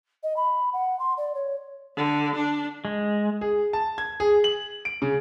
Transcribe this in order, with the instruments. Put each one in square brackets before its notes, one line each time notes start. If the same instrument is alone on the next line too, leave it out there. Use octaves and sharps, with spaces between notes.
[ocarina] D#5
B5
F#5
C6
D5
C#5
[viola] D3
D4
[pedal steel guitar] G#3
[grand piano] G#4
A5
G#6
G#4
F#7
D7
C#3